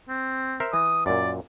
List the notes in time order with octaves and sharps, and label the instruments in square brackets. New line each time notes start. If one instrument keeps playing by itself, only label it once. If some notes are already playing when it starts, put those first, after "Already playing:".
[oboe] C4
[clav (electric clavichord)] A#4 C5 E5
[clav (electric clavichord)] E3 [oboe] D#6
[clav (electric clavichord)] F#2 A#2 [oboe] D5